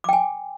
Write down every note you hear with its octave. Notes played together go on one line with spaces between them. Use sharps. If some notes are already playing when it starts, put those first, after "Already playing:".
G5 G#5 D6